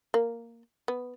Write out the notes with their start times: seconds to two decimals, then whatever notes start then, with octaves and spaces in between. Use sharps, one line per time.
0.14 A#3
0.88 B3